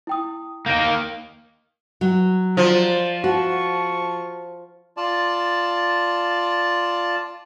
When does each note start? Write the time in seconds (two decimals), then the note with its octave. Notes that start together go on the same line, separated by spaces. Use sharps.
0.07 E4 G5 D#6
0.66 D#3 A#3 G6 A#6 D7
2.01 F#3
2.57 F3 D5
3.24 F#4 A5 C#6
4.97 F4 D5 A5